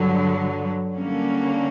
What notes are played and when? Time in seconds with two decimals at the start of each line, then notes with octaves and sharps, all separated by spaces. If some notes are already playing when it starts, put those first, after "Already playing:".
Already playing: G2 D3 F#3
0.96 D3 G3 A#3 C#4